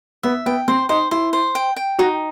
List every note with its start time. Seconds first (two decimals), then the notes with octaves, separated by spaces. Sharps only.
0.23 B3 E5
0.46 B3 G5
0.68 C4 C5
0.89 D#4 C5
1.11 E4 C5
1.33 C5
1.55 G5
1.76 G5
1.99 D#4 F#4